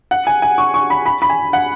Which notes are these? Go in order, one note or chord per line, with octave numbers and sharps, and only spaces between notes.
F#5
G#5
G#5
C#6
C#6
B5
B5
B5
G#5
F#5